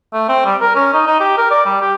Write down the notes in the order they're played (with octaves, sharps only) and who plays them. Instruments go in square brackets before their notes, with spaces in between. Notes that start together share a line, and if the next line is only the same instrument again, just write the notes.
[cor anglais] A3
C4
G3
A#4
C#4
D#4
D#4
G4
A#4
D5
G3
G4